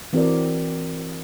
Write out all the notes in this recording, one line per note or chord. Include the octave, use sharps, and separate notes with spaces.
E3 C4 F#4 A#4 D5